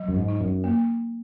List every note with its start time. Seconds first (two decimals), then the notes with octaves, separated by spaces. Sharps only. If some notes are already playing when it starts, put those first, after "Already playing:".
Already playing: F#3
0.08 F#2
0.17 G#2
0.28 D#4
0.41 F#2
0.64 A#3